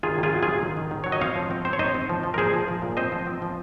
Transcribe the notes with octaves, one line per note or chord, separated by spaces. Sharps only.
D#3 F4 G#4
D#3
F4 G#4
F#3
F4 G#4
F#3
D#3
D#3
D#3
F#3 C#5
D#5
C4 C#5 F5
F3
C4
C4 C5
C#5
D#4 C5 D#5
C4
F3
F3
A#4
A#2 G#4 C5
F3
F3
A#2
C4 C5 D#5
F3
C4
F3